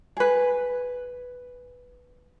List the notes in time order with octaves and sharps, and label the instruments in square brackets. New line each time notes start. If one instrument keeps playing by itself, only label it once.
[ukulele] G#4 B4